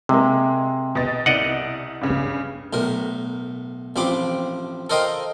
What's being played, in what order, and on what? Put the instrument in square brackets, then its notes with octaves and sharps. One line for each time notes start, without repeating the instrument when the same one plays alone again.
[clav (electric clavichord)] C3 [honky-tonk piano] G#3 A#3
[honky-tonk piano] B2 D#5 A6
[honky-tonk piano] C2 [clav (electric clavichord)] D5 D#5 F#5
[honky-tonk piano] G2 C#3
[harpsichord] B1 A2 A#4
A1 F3 C4 B5 D6
A4 A#4 C5 D#5 F5 G5